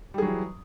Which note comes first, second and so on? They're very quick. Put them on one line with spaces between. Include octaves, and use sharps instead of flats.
G3 G#4 F#3 E3